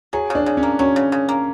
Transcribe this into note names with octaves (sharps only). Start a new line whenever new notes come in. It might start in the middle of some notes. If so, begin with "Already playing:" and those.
F#3 G#4
C#3 D4
C#3
C#4
A#3
F#3 C#4
C#3
C#3
A#3